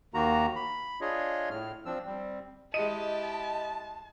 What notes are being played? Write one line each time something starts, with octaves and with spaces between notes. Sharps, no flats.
D#2 D#3 A#3 F#4 A#5
B5
D4 F4 G#4 C#5 D#5
A2 F6
F3 C4 D4 E6
G3 C4
G#3 E4 G4 D#5 A5 D#7